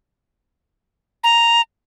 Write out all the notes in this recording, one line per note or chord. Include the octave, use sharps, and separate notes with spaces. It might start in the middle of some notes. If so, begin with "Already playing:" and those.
A#5